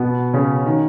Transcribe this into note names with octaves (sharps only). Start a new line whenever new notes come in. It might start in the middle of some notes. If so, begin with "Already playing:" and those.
Already playing: B2 B3
C#3 C#4
D#3